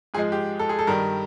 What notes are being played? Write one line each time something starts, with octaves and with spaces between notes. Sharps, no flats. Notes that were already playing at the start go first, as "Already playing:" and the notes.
G#2 F3 G#3 G#4
G4
A4
G#4
A4
G2 D#3 G3 A#4